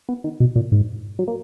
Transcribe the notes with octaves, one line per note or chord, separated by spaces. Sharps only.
B3
D#3
B2
A#2
G#2
F#3
A#3